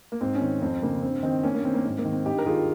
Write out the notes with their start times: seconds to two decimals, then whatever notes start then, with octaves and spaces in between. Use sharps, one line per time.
0.12 A#3
0.21 G#2 C4
0.35 C#4
0.41 D#3 C4
0.62 F2 C4
0.82 C#3 A#3
1.02 G2 C4
1.23 D#3 C4 D#4
1.43 G2 A#3 C#4
1.54 A#3
1.64 D#3 C4
1.74 A#3
1.85 G#2 C4
1.98 A#3
2.05 D#3
2.13 C4
2.26 G2 D#4 G4
2.38 A#4
2.46 D#3 F4 G#4